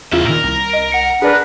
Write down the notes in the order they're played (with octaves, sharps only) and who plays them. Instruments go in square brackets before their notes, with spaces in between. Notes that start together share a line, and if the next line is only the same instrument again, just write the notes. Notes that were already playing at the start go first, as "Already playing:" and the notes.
[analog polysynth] E2 C#3 F4 [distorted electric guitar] C#4 E5
[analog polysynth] A#2 D#3 [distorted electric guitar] A#4
[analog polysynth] C2
[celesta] D#5 D7
F#5 C#7
[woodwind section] D4 A#4 B4 [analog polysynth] G#4